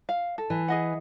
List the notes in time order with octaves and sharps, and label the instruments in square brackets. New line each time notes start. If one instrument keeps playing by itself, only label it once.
[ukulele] F5
A4
[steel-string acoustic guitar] E3
[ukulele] G#4 D#5 F#5